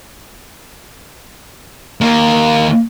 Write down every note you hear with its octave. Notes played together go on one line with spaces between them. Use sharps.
D#2 A#3